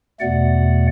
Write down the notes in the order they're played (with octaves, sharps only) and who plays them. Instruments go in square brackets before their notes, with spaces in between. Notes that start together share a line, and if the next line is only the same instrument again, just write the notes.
[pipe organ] E2 B2 A3 D5 F#5